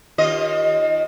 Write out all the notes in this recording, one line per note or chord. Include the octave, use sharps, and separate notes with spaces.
D#2 F4 D#5